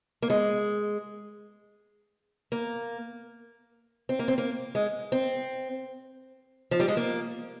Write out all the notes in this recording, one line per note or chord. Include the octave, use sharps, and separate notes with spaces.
A#3
G#3
A#3
C4
A#3
C4
A#3
G#3
C4
F3
G3
G#3
A#3